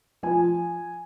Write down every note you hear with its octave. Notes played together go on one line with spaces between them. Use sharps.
F3 G#5